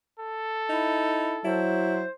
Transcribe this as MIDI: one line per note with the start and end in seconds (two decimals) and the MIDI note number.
0.20 1.60 69
0.70 1.36 63
0.70 1.39 64
1.45 2.05 54
1.45 2.07 64
1.45 2.10 72